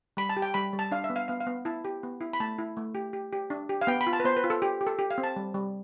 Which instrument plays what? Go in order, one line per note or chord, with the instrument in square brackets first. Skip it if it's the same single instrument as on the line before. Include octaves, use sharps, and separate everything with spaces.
[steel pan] G3 B5
A5
G4
G5
G3 B5
G3
A5
D4 F5
E5
B3
F5
B3 F5
F5
B3
E4 A5
G4
B3
E4
B5
A3 A5
E4
A3
G4
G4
G4
D4
G4
F5
B3 G5
B5
F4
A5
B4
B3 C5
B4
F4
A4
G4
G4
A4
G4
F5
C4
A5
G3
G3